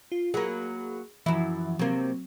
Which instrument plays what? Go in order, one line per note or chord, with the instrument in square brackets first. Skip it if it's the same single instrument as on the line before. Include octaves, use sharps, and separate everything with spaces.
[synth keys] F4
[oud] F#3 A#3 [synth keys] G#4 B5
[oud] F#2 E4 [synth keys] E3 F3
[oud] C3 A#3 [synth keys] F#3 C4